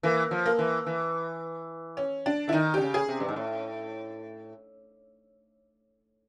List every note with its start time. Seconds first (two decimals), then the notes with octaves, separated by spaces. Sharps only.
0.03 E3 A#3
0.31 F3
0.46 A#3
0.59 E3
0.86 E3
1.97 C#4
2.26 D4
2.48 D3 E4
2.52 D#3 D#4
2.74 D3 G4
2.81 C#3
2.94 G#4
3.08 C3
3.20 G2
3.28 G#2
3.36 A2